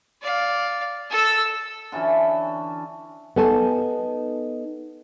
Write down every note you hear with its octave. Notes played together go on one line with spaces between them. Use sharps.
D5 F5
A4 E6
D3 E3 F#3 C#4
B3 D#4 A4 G#5 A5